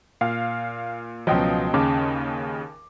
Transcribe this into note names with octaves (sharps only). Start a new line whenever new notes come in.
A#2 F5
C#2 B2 F3 F#3 D#5 G5 C6
D#2 C#3 C#4 A5 D6